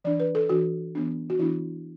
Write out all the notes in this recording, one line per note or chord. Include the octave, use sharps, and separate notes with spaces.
E3 D4 D5
B4
A4
E3 D4 F#4
E3 B3 D4
F#4
E3 B3 D4 E4